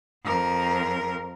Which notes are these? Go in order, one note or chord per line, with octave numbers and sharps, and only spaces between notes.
F2 A#4